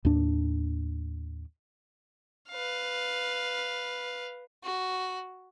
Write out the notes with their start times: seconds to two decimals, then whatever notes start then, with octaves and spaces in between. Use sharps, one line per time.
0.05 D#2 A2 D4
2.50 B4 F5
4.63 F#4